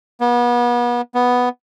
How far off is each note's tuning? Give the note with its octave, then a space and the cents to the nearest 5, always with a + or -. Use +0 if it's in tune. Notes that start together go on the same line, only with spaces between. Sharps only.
B3 -35
B3 +0